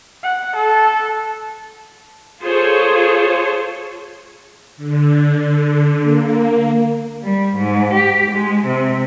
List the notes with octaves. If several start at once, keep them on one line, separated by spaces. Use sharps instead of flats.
F#5
A4
F4 G#4 A4 C5 C#5
D3
D3
A#3
G3
G#2
G4
G#3
C3